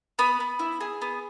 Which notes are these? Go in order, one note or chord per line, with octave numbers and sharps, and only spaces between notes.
B3 B5
B3
E4
G#4
B3